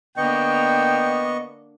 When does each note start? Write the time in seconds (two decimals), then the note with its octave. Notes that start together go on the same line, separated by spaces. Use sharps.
0.17 D3 A#3 B3 D4 D#5 G5 C#6